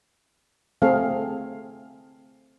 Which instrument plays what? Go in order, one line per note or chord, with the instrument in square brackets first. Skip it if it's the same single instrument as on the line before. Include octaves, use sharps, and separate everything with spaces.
[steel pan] A3 C4 G#4 A4 F5